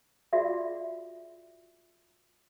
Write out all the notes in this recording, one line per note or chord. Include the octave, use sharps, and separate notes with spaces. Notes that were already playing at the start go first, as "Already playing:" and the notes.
F4 F#4 G#4 D5 E5